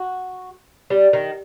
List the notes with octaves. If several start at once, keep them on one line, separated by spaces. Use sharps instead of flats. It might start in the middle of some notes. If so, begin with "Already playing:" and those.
Already playing: F#4
G3
D#3